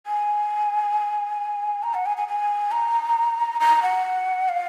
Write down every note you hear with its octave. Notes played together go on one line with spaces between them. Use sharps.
G#5
A#5
F#5
G#5
G#5
G#5
A#5
A#5
F#5
F5